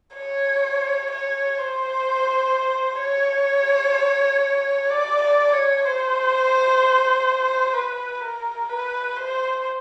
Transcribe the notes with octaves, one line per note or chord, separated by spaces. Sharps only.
C#5
C#5
C5
C#5
D5
D5
C#5
C5
B4
A#4
B4
C5